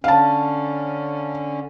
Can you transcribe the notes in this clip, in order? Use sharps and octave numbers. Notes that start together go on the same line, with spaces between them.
D3 C#4 F5 A5